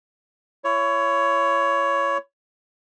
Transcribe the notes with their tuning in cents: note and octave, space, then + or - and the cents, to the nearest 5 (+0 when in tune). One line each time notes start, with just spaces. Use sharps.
E4 +30 C#5 +15